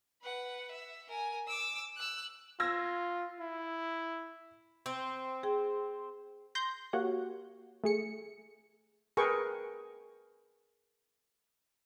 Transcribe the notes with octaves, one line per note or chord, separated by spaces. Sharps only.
B4 F#5
E5
A#4 G#5
D6 E6
E6 F#6
F4 E6 G#6 A#6
E4
C4
G#4 G5
C6 G6 A#6
A#3 F#4 G4 C#5 F#5
A3 G#4 C#7
G#4 A#4 B4 G5 C#6